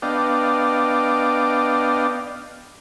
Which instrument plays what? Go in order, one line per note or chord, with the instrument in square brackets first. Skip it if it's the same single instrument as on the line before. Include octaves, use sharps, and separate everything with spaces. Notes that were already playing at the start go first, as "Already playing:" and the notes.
[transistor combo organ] B3 D4 D5 D#5 F5 G5